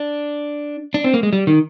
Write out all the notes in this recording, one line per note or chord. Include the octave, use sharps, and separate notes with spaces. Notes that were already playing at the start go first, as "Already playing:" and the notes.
Already playing: D4
D4
C4
A#3
G#3
G3
D#3